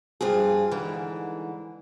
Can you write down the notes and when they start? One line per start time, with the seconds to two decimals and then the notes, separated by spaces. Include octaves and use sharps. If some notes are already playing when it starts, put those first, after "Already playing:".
0.21 G2 F3 F4 G#4
0.71 G#2 D3 E3